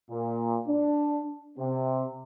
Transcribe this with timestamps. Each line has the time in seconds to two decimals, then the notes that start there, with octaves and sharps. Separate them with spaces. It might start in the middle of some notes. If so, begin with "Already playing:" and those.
0.11 A#2
0.68 D4
1.58 C3